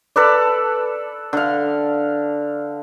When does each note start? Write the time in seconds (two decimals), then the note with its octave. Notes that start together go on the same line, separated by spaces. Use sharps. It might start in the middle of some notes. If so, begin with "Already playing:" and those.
0.16 A4 B4 D5
1.33 D3 F5